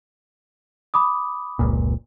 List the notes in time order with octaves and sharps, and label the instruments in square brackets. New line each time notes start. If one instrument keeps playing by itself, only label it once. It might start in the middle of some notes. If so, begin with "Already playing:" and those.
[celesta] B5 D6 D#6
[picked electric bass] F1 C#2 A#2